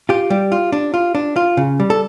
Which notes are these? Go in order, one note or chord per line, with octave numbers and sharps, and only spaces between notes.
F4 G4
G3
F4
D4
F4
D4
F4
C#3
G3
A4